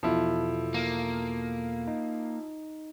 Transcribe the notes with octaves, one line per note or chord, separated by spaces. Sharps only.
E2 B2 F3 E4 A4
A#3
D#4